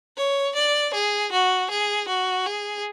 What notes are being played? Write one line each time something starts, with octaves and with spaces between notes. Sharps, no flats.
C#5
D5
G#4
F#4
G#4
F#4
G#4